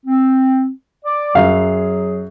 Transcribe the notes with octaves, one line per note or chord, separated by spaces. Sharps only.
C4
D5 D6
F#2 F#3 G#4 F5